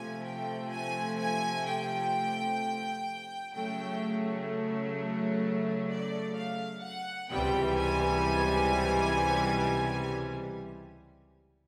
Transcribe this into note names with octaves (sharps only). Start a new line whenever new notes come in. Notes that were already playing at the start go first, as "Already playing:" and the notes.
Already playing: C3 F3 A3 G#5
G5
G#5
G#5
G5
C#3 F#3 A3 G5
D5
F5
F#5
C#2 C3 E3 G3 G5
G#5